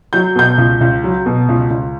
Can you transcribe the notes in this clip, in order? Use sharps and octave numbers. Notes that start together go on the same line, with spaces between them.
F#3 G6
B2 G6
C#2
C#2
F#3
B2
C#2
C#2